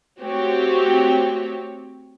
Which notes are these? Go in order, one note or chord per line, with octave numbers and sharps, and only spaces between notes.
A3 C4 F#4 G4 C#5